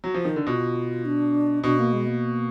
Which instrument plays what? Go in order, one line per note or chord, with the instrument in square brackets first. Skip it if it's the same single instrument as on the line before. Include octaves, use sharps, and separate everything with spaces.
[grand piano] F#3
F3
D#3
D3
[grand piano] B2 [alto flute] F4
[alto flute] D4
[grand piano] B2 [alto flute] D4
[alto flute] A#3
G#3
A#3